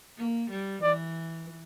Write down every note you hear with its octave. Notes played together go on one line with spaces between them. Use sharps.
A#3
G3
E3 D5